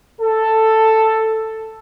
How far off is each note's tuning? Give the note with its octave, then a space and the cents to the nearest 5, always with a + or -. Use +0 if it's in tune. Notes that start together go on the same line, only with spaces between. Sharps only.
A4 +5